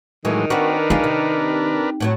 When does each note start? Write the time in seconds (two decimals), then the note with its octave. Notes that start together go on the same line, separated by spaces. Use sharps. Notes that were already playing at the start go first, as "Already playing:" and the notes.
0.25 A2 D#3 E3 F#3 G#3
0.50 C4 D4 F#4 A#4 B4
0.90 D#4 F4 G#4
1.04 C3
2.00 A2 F3 F#3